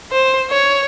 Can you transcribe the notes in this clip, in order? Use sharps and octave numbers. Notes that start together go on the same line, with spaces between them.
C5
C#5